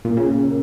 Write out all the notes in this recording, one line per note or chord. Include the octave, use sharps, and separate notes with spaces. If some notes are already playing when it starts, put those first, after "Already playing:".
A#2
C#3 C#4
A#4